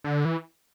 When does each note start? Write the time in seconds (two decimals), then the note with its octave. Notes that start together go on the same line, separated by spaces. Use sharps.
0.04 D3
0.25 E3